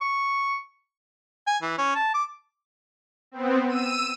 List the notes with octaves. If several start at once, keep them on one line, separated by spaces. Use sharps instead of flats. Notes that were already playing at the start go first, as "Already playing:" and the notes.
C#6
G#5
E3
C#4
A5
D6
B3 C4
E6 D#7